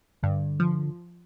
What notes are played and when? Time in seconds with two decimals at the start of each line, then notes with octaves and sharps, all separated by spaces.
0.23 G2 D3
0.60 F3